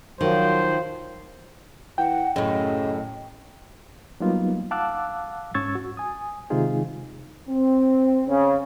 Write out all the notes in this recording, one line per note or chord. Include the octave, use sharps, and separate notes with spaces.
D#3 F3 F#3 C5
E3 F#5 G5
F#2 A2 C#3 D#5
F#3 G3 A#3 B3 D#4 F4
F5 F#5 A5 D6 E6 F#6
G#2 C#4 C#6 E6 G#6 A6
F#4
G#5 D#6
C3 D#3 G#3 D#4 F4 G#4
C4
C#3